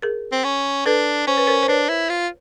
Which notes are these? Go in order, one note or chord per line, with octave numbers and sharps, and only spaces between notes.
G#4 A#4
C4
C#4
D4 A4 B4
C#4 C5
B4
A#4 C5
C5
D4 B4 C#5
E4
F4